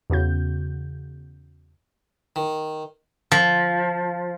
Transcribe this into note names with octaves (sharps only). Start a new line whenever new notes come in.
E2 C#3 F#4 G6
D#3
F3